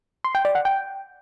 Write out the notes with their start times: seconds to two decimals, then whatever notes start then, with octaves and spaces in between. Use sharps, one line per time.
0.24 C6
0.35 G5
0.45 D5
0.55 F#5
0.65 G5